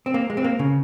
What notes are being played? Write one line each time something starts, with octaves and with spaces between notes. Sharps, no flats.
C4
A#3
G#3
C4
A#3
C#3